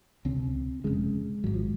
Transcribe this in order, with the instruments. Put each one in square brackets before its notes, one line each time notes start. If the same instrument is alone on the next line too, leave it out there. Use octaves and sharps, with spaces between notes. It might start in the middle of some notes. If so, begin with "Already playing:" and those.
[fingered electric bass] C#2 C3 C4
F1 D#2 C#3 G#3
G#1 G#2 F#3
F3